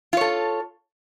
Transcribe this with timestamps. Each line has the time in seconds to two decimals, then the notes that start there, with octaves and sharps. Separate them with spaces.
0.13 F4
0.17 C#5
0.21 A4